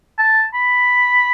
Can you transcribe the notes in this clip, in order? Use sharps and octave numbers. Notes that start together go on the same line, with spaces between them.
A5
B5